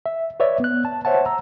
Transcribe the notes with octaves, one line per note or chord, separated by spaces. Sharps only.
E5
B4 C#5 D5 E5
B3 F#6
A5
C5 C#5 E5 F#5 A5
A#5 E6